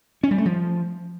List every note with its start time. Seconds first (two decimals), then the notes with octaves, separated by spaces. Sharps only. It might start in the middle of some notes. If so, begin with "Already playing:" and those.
0.23 C#4
0.31 G3
0.38 A3
0.45 F3